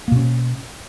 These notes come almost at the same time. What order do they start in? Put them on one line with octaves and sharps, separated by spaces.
A#3 B2 C#4